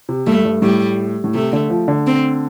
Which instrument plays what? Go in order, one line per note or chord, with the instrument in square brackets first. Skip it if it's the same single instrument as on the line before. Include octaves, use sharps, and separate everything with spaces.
[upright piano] C3
[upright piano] G2 [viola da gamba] A3
[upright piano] G2
[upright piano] A2 [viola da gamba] G3
[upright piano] A2
[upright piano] C3 [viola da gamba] A3
[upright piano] D3
F3
D3
[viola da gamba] C4